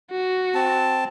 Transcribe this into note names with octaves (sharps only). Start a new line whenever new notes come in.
F#4
C4 A5